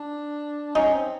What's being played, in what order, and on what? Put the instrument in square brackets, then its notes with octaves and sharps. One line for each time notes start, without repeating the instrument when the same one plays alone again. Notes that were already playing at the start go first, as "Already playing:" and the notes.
Already playing: [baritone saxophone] D4
[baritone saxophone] C#4 [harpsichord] D#4
[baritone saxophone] C4